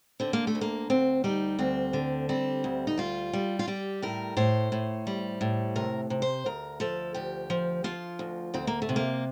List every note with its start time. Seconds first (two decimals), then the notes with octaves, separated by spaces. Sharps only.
0.20 D3 C4
0.33 A#3
0.47 A3
0.55 D2
0.61 A#3
0.90 D2 C4
1.24 G3 D#4
1.59 D2 C4
1.93 D3
2.29 G3 C4
2.64 D2
2.87 D#4
2.97 G3 F4
3.33 G3
3.59 F4
3.67 G3 G4
4.02 A2 A#4
4.37 A2 C5
4.72 A2
5.07 G3
5.41 A2
5.76 C3 A#4
6.10 C3
6.22 C5
6.46 D2 A#4
6.80 F3 A4
7.14 D2 G4
7.50 F3
7.84 F3 F4
8.19 D2
8.54 D2 C4
8.67 A#3
8.82 A3
8.89 C3
8.96 A#3